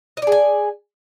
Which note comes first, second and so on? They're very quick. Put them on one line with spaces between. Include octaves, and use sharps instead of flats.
D#5 D5 G#4 G#5